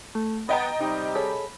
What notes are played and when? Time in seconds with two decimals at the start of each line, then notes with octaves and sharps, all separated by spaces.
0.15 A3
0.49 B3 D#5 G5 A#5 A6
0.81 C3 G3 D#4 G4
1.15 G#4 A4 C#5 B5